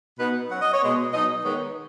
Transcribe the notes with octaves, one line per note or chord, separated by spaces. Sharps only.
B2 B3 D#4 B4
F#3 C#4 F#5
D#5
C#5
B2 G#3 B3 D#5
B2 F#3 D#4 D#5
D#3 G#3 B3 D#4 C#5